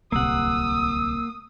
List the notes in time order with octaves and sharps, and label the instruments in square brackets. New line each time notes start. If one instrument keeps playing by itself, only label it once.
[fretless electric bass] D1 C2 C3 [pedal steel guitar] A#3 F#5 [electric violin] D#6 [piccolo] E6